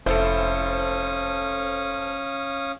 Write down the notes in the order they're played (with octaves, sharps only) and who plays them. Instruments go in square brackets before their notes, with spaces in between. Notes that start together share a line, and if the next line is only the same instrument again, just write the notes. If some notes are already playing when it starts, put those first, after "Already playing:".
[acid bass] F1 [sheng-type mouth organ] C#4 F5 D#6 [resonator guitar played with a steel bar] E4 [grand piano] A4 C5